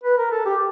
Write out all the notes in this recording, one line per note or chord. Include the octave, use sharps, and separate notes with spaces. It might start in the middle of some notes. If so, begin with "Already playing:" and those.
B4
A#4
A4
G4